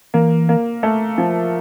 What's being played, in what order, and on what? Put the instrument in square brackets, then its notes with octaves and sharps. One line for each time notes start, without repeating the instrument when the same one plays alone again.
[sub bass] E3 [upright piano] A#3
[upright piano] A#3
A3
F3